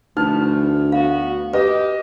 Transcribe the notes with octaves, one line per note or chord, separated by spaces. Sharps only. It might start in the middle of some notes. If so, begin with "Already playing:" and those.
D2 E3 F3 A3 D#4 F6
B3 F#4 F5
G4 B4 D#5